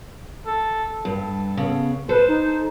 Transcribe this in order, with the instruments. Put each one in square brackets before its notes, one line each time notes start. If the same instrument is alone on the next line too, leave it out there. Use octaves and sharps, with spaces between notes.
[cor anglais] A4
[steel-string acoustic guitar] G2 [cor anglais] A4
[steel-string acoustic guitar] C#3 B3
[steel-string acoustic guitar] A4 [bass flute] B4 [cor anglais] C5
[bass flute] D#4